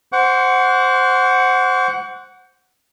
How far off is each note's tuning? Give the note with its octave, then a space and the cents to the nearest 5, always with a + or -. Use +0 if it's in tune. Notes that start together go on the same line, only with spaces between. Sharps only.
C5 +0 F#5 +0 C#6 +45